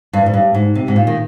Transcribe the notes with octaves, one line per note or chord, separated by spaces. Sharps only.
G2
G#2
G2
G#2
C3
G#2
A#2
D#3